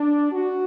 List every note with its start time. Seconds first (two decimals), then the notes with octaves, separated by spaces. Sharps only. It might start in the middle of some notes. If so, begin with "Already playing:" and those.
Already playing: D4
0.32 F#4